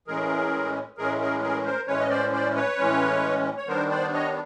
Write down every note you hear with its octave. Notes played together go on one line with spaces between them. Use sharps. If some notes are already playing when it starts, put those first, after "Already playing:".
A2 E3 G#3 C#4 G#4 A#4
A2 E3 G#3 C#4 G#4 A#4
G#4 A#4
G#4 A#4
A#4 C5
A2 E3 G#3 C#4 B4 C#5
D#5
C5 D5
C5 D5
B4 C#5
A2 E3 G#3 C#4
C#5
D#3 G3 B3 D4 A#4 C5
C5 D5
C#5 D#5